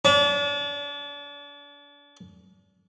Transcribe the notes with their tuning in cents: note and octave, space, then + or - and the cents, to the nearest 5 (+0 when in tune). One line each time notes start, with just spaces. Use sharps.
D4 -35